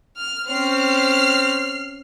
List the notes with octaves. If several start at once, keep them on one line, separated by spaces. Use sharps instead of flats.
F6
C4 C#4 F6 C7